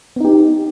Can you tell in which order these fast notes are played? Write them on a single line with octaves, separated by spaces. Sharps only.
B3 D#4 G4